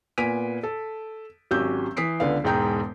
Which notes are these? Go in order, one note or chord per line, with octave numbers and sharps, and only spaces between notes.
A#2 B3 G#5 B6 D7 D#7
A4
G#1 F#3 C#4 G4 E6 G6
E3 D#6 B6 C7 D7
C#2 D3 B3 F5
E1 G#2 G#3 G5 A#5 G6